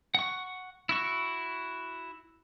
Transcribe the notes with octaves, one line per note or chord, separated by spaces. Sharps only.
F#5 C#6
E4 F#4 C#6